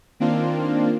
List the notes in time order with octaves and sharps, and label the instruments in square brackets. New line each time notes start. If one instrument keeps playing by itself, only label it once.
[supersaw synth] D#3 A#3 C4 D4 F4